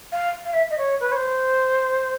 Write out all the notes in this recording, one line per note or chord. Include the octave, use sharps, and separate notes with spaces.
F5
F5
E5
D#5
C#5
B4
C#5
C5